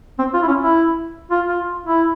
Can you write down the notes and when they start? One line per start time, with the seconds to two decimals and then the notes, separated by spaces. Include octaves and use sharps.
0.19 C4
0.34 F4
0.43 E4
0.48 C#4
0.62 E4
1.31 F4
1.48 F4
1.86 E4